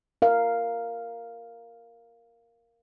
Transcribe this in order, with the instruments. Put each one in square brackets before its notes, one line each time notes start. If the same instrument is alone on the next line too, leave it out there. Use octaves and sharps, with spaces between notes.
[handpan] A#4 F5